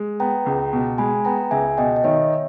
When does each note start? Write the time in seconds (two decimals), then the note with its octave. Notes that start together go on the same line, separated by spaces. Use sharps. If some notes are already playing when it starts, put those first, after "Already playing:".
Already playing: G#3
0.20 B3 G5 A#5
0.46 C#2
0.73 B2
0.98 G#3 G#5 B5
1.25 B3 G5 A#5
1.51 C#2 E5 G#5
1.78 B2 D#5 G5
1.96 D#5
2.04 D#3 C#5 E5